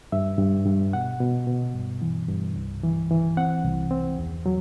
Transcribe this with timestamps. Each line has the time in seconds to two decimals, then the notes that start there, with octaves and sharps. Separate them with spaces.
0.12 G2 E5
0.38 G2
0.66 G2
0.93 B2 F#5
1.21 B2
1.47 B2
1.74 G2
2.02 E3
2.28 G2
2.56 C2
2.83 E3
3.10 E3
3.37 C4 F#5
3.64 C2
3.91 C4
4.18 E2
4.46 F#3